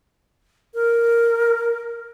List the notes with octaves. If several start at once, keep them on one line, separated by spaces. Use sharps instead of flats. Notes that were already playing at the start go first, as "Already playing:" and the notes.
A#4